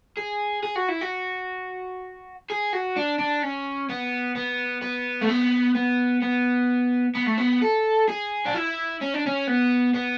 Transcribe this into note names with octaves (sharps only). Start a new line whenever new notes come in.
G#4
G#4
F#4
E4
F#4
G#4
F#4
D4
D4
C#4
B3
B3
B3
A3
B3
B3
B3
B3
A3
B3
A4
G#4
D4
E4
C#4
D4
C#4
B3
B3